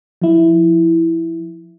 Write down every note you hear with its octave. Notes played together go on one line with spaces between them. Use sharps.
F3 E4